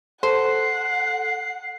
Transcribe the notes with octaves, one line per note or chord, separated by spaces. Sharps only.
A4 C5 F#5 C7